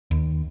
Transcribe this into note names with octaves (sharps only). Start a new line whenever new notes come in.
D#2